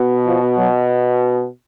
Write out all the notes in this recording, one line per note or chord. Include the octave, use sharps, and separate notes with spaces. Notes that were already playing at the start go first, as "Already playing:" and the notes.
Already playing: B2
F3
F#3